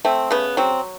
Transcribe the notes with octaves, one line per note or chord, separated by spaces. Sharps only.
A3 C4
C#3 B3
F#3 C4